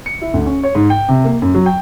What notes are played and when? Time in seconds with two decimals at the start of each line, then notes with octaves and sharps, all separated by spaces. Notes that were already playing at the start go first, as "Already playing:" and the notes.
0.06 C#7
0.21 E4
0.34 D2
0.46 C#4
0.63 C#5
0.75 G#2
0.90 G5
1.09 C3
1.25 A#3
1.42 F#2
1.55 F#3
1.66 G5